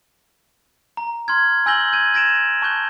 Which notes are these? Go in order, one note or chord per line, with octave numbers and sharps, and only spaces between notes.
A#5
C6 F6 G#6
G#5 E6 G6 A#6 F#7 G7
G6 G#6 D#7
G#6 A#6 D7 E7
A5 C#6 F#6 G6 G7